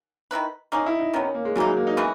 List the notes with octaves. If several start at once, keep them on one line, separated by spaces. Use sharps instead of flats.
D#3 A#3 E4 B4
A#3 C#4 D#4 G#4
E4
D#4
D#3 F#3 B3 C#4
C#4
A#3
G#3
C#3 E3 F#3 A#3 D#4
G#3
A#3
D#4
C#3 E3 B3 F#4